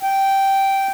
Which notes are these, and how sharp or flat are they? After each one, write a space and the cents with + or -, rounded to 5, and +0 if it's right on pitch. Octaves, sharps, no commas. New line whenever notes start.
G5 -10